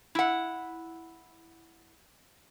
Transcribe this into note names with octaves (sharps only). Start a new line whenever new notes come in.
E4 F#5